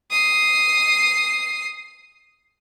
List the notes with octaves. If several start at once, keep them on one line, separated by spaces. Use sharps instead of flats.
D#6 C7